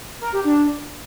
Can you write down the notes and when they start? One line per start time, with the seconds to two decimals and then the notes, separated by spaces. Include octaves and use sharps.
0.21 A#4
0.33 G4
0.44 D4